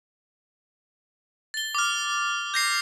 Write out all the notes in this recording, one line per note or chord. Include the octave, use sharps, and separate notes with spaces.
A6 G7
D6 F6
G6 A#6 C7